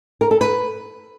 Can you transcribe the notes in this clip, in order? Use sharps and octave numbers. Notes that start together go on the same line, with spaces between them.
A#4
A4
B4